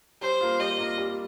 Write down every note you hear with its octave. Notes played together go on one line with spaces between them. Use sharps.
G3 C5
A#3 F4
G3 D#5
A#3 F4
G3